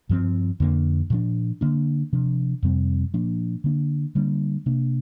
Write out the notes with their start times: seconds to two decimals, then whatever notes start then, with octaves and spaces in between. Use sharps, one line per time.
0.09 G2 F3 C4
0.60 F2 D3 A#3 D4
1.10 A#2 F3 D4
1.61 D3 A#3 D4
2.13 C3 F3 D4
2.63 F2 C3 G3 C4
3.14 A#2 F3 A#3 D4
3.64 D3 A#3 D4
4.15 D3 G3 A#3 D4
4.66 C3 A#3 D4